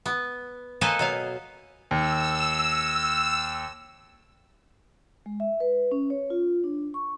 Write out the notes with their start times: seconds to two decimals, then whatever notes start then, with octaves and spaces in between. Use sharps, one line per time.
0.06 B3
0.81 A#3 A4 B4 C5 D#5 G#5
0.99 B2 F#3 F5
1.91 D#2 E6
5.26 G#3
5.40 E5
5.60 B4
5.92 C#4
6.10 C#5
6.30 F4
6.64 D4
6.94 C#6